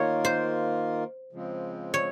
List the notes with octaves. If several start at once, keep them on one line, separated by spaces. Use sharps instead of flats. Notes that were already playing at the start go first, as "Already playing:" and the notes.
Already playing: D#3 A#3 F4 A#4 C#5
C5
C#3 F3 G#3 C4
C#5